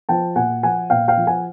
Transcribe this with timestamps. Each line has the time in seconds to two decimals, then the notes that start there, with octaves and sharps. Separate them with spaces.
0.09 F3 G5 A5
0.36 A#2 F#5 G#5
0.63 F3 F#5 G#5
0.90 A#2 F5 G5
1.08 F5 G5
1.17 F3
1.27 F#5 G#5